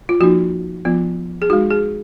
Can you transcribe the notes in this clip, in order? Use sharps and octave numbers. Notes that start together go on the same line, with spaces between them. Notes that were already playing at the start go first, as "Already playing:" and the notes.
F4
F3 A#3 D#4 F#4
F3 B3 F4
G#4
G#3 D#4 F#4
G#4